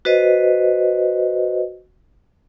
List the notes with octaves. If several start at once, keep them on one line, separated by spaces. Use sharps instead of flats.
F#4 B4 C5 D#5